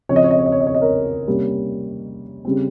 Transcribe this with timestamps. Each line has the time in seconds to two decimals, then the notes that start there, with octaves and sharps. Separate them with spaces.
0.09 C#3 F3 C4 C#5
0.16 D#5
0.24 C#5
0.31 D#5
0.39 C#5
0.46 D#5
0.52 C#5
0.61 D#5
0.67 C#5
0.74 D#5
0.81 A#4 C#5
1.27 C3 G3 A#3 C#4
2.45 C#3 G3 C4